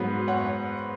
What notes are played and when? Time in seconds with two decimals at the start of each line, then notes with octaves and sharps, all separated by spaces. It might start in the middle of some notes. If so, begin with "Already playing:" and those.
Already playing: G#2 F#3 B3
0.28 C#5 F#5